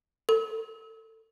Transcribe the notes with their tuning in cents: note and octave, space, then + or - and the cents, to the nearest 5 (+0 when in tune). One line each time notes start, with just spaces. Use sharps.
A4 +25